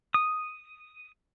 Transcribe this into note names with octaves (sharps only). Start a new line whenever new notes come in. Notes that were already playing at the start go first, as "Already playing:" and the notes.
D#6